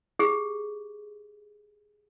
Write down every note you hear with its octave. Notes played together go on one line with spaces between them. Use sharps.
G4 G#4